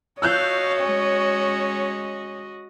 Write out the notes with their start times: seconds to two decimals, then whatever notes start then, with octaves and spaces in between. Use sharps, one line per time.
0.22 F#4 C#5 D#5 F5 A5 E6 F#6 G6
0.79 G#3 C#4